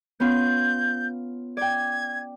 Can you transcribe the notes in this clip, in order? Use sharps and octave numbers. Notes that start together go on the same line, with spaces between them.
B3 C#4 F4 G6
D5 G5 G#6